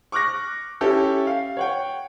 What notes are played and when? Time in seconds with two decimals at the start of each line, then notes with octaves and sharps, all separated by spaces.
0.12 C#6 D6 F6 F#6 A#6
0.81 C#4 E4 G4 A4
1.27 F5
1.57 C#5 F#5 G5